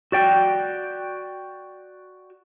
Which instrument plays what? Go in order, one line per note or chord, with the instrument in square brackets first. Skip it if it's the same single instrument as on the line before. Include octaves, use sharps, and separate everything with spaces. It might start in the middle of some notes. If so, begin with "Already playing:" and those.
[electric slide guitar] F#4 D5 G5